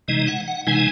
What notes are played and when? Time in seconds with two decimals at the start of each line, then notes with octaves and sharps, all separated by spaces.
0.08 C3 E3 G#3 D#4 D#5
0.27 F#5
0.48 F#5
0.67 C3 E3 G#3 D#4 G#5